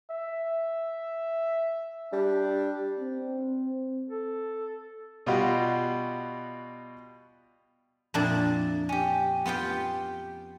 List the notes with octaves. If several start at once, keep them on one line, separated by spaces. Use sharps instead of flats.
E5
G3 D4
C4
A4
B2 G3 F4 F#4 F#5
F2 A#2 A#3 D4 E4 A5
C#4 G4
B3 F4 G4 G5